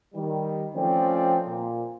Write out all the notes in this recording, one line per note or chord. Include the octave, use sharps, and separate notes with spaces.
D#3 G3
F3 A3 C4 C#4 D5 G5
A#2